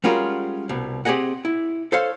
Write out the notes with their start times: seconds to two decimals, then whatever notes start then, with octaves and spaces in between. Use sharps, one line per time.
0.04 G3 G#3 C#4 F4 F#4 A#4
0.69 C2 B2
1.05 C4 G4 G#4 D#5 F#5
1.45 E4
1.92 A4 C5 C#5 F5